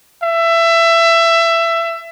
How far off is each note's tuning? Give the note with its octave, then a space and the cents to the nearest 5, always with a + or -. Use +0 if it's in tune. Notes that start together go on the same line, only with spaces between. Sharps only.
E5 +20